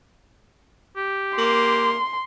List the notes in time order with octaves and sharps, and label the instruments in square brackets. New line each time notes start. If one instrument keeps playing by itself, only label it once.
[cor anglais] G4
[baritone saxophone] A#3 [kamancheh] C6